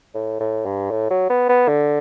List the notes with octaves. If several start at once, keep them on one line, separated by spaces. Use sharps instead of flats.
A2
A2
G2
A2
F#3
B3
B3
D3